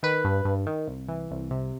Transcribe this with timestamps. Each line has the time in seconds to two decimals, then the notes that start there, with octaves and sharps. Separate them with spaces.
0.03 D#3 B4
0.24 G2
0.45 G2
0.67 D#3
0.87 C2
1.08 E3
1.31 C2
1.51 C3